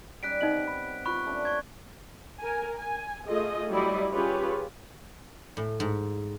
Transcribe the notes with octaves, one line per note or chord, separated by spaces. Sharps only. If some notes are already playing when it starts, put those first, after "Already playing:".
G3 C#4 D#4 F#6 B6 D7
C3 D#3 B3 D#4 D#5 F#7
B5
F4 B5 C#6 F#6
A3 C#4 D4
C5 C#6 G#6
A#4 G#5
G#5
A3 F4 G#4 D#5
F#3 G3 E4 D5 D#5
C#4 F4 G4 G#4 B4 C#5
A2
G#2